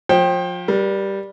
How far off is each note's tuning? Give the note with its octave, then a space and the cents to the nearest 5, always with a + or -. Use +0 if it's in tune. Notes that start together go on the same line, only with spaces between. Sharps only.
F3 +30 C5 +35 G5 +0
G3 +0 A#4 +40